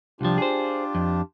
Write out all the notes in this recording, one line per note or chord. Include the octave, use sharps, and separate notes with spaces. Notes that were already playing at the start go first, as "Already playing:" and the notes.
C2 F3 D4 F4 G4
G#4 C5
F2